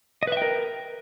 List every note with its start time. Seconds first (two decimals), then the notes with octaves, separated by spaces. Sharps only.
0.23 D#5
0.27 B4
0.32 E5
0.37 G5
0.42 A#4